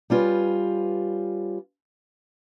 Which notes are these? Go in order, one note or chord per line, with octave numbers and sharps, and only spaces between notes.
G3 C#4 F4 B4